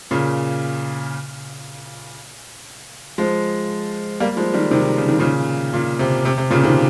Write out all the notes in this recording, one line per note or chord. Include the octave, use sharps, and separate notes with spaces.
A#2 C#3
F3 G#3
G3 A#3
F3 G#3
D#3 G3
C3 D#3
C#3
D#3
A#2 C#3
A#2
C3
C3
C3
A#2 C#3
C3 D#3